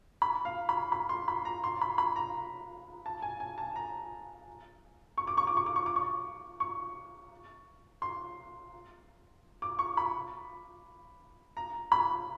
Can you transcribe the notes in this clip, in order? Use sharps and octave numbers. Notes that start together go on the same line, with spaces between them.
B5
F5
B5
B5
C6
B5
A#5
C6
B5
B5
A#5
A5
G#5
G#5
A5
A#5
C#6
D6
C#6
D6
C#6
D6
C#6
D6
C#6
C#6
C6
D6
C#6
B5
A#5
B5